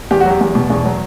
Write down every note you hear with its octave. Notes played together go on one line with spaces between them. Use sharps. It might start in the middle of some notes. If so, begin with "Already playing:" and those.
E2 G4
F#4
F#3 G4
E2
B2
E2
F#3